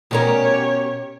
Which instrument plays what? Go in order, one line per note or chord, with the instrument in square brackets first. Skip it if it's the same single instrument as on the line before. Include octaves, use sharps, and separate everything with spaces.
[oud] B2 C#4 A#4 [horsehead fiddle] G4 C#5